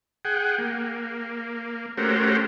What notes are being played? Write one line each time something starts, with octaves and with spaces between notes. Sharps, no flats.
G#4 F#5 G5
A#3
A3 C#4 F#4 G4 A#4 C5